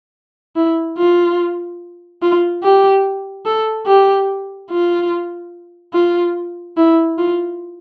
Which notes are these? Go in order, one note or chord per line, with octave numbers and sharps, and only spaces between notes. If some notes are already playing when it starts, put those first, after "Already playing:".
E4
F4
F4
G4
A4
G4
F4
F4
E4
F4